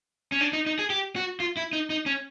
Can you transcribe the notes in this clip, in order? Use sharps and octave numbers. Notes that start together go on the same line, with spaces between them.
C#4
D4
D#4
D#4
G#4
G4
F#4
F4
E4
D#4
D#4
C#4